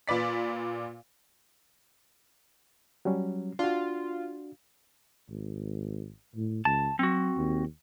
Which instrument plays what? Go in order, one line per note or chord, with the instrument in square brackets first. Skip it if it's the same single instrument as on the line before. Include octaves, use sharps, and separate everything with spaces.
[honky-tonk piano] A#2 B4 D5 B6
[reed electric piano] F#3 G3 C#4
[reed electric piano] D4 F#4 [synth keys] F4
[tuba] G#1
A2
[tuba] C#2 [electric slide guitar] A5
[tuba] F#3 [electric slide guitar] C4 F#4
[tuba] D#2